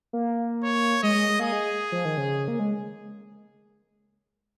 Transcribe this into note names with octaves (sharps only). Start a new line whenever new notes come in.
A#3
C#5
G#3 D#5
G#3
G#3
A#3 G#4
G#3
F3
D#3
C#3
A#3
G#3